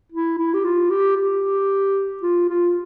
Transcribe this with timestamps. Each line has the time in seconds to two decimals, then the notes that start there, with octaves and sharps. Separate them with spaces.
0.12 E4
0.38 E4
0.54 G4
0.64 F4
0.91 G4
1.17 G4
2.23 F4
2.49 F4